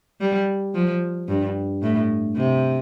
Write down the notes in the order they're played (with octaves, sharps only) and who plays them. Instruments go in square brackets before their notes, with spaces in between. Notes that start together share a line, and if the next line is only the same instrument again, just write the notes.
[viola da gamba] G3
F3
G2
A2
C3